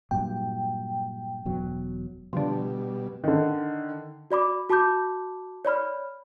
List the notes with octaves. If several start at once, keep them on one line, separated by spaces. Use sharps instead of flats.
G2 A#2 F#3 G5
E1 B2 F#3
B2 D3 F3 G3
D3 D#3
F#4 D5 B5 D6
F#4 A5 B5 D6 G6
C#5 D5 B5 F6